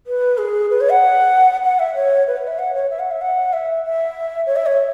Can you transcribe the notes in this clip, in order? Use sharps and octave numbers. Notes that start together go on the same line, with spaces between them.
B4
G#4
B4
C#5
F#5
F#5
E5
C#5
B4
C#5
E5
F#5
C#5
E5
F#5
E5
F#5
E5
E5
C#5
E5
C#5